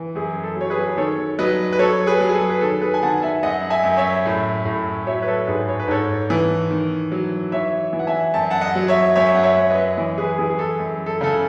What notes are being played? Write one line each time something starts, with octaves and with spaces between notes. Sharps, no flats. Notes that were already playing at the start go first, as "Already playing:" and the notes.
Already playing: E3
F#2 G#4
A4
F#3 C#5
G#4 B4
D#3 A4 C#5
F#3 B4 D#5
B4
F#3 A4 C#5
G#4 B4
F#3
G#4
A4
B4
D#3 A4
G#4 B4
G#5
D#3 F#5 A5
E5 G#5
F#2 D#5 F#5
E5 G#5
F#2
C#5 E5
A2
A2
F#3 C#5 E5
B4
A4 C#5
G#2 G#4 B4
C#5
B4
G#2 A4 C#5
E3
D#3
F#3
E3 C#5 E5
E3
F#5
E5 G#5
F#2 A5
F#5 A5
D#5 F#5
F#3
C#5 E5
F#2 C#5 E5
F#5
C#5 E5
F#2
B4 D#5
E3
G#4 B4
E3 G#4
G#4
A4
F#2
A4
C#3 A4